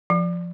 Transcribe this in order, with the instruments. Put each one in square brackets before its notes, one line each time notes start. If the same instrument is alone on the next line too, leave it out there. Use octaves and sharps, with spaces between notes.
[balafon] F3